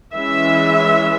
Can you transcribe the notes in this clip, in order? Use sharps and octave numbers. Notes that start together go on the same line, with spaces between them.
E3 G#3 C#4 E5